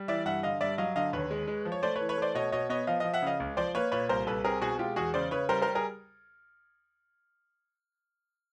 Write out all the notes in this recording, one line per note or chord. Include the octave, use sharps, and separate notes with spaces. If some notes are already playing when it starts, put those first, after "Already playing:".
Already playing: G3
E3 D5 E5
G2 E5 F#5
D3 D#5 F5
G2 D5 E5
F#3 D#5 F5
D3 D#5 F5
D#2 B4 C#5
G#3
G#3
F3
C#5
A3 C5 D5
B4 C#5
E3
B4 C#5
A3 C5 D5
B2 C#5 D#5
B2 C#5 D#5
B3 C#5 D#5
F3 D#5 F5
F3 D#5 F5
E5 F#5
C#3 D#5 F5
C#2
F3 C5 D5
A#3 B4 C#5
A#2 B4 C#5
C2 A#4 C5
C2 A4 B4
C4 G#4 A#4
B2 F#4 G#4
G#3 F4 G4
E2 F#4 G#4
C#3 C5 D5
C#3 B4 C#5
G3 A#4 C5
A#4 C5
G3
G#4 A#4